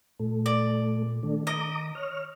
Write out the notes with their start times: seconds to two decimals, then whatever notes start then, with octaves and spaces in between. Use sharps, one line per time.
0.19 A#2 A3
0.46 D5
1.23 D#3 A3 D4
1.47 D#5 A#5 D6 D#6
1.95 C#5 F6